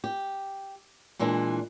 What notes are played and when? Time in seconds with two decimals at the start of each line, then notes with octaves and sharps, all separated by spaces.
0.04 G4
1.19 A#2 E3 G#3 D4 E4